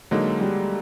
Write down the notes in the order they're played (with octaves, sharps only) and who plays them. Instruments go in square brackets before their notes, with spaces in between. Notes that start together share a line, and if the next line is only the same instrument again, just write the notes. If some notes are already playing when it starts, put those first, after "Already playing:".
[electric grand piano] D3 F#3 A#3 D#4 [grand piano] G#3
[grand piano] G3